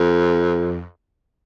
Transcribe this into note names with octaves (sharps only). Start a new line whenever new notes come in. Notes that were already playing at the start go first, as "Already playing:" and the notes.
Already playing: F2